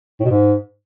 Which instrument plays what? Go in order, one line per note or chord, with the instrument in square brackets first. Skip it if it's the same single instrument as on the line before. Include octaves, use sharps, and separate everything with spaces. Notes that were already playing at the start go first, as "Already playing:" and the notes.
[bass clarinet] A2
B2
G#2